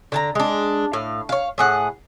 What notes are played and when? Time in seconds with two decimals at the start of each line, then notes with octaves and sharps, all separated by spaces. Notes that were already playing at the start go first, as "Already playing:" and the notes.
0.12 D3 A5 A#5
0.35 G#3 D4
0.93 A2 F5
1.29 C#5 F5
1.58 A2 G#4 F#5